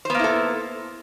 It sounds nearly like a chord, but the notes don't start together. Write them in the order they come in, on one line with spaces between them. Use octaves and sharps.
C5 B3 A#3 E4 A4